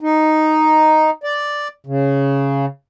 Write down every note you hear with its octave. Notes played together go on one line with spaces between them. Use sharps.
D#4
D5
C#3